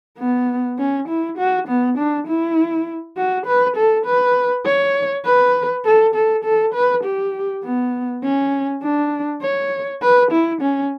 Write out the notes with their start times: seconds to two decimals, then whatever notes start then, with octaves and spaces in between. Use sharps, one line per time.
0.18 B3
0.79 C#4
1.08 E4
1.38 F#4
1.68 B3
1.98 D4
2.27 E4
3.17 F#4
3.46 B4
3.76 A4
4.06 B4
4.66 C#5
5.25 B4
5.85 A4
6.15 A4
6.44 A4
6.74 B4
7.04 G4
7.63 B3
8.23 C#4
8.82 D4
9.42 C#5
10.02 B4
10.31 E4
10.61 C#4